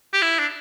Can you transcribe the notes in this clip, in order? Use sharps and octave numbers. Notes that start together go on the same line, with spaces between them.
G4
E4
D4